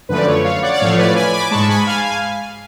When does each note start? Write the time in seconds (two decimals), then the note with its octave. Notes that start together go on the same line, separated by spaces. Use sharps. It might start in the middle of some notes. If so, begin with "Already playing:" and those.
0.09 F#2 D3 F3 A3 B4
0.17 D5
0.27 C#5
0.44 C#5 F5
0.62 D5 F#5
0.73 D5
0.80 A1 A2 F3 A3 C#5 F5
0.98 B4 D5
1.15 G#5 B5
1.33 B5 D6
1.51 G#2 G#3 A5 C#6
1.69 G#5 B5
1.87 F5 G#5
2.04 F5 G#5